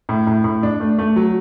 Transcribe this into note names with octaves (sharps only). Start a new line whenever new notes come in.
A2
A2
A2
D4
A3
A3
F#3